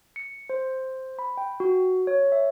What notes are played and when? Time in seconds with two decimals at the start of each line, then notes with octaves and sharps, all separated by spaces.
0.16 C#7
0.50 C5
1.19 B5
1.38 G5
1.60 F#4
2.07 C#5
2.32 E5